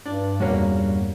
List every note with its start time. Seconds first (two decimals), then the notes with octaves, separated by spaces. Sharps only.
0.06 G2 D4
0.40 E2 G2 A#2 G3 A#3 C#4 F#4